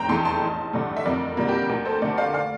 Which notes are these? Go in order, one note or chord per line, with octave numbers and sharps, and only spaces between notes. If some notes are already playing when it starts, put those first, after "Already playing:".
Already playing: F1 G5 A#5
E2 E3 A3 A5 C6
A5 C6
A1
G2 D3 A3
E5
F2 A#4 D5
D3 G3 A#3
G4 A#4
D2 G4 A#4
A4 C5
D3 A3 A#4 D5
D5 F5
D5 F5